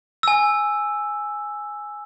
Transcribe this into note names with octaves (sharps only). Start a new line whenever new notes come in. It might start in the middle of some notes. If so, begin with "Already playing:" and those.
G#5 E6